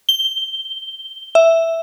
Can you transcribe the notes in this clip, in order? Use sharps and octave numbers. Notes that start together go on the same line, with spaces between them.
G7
E5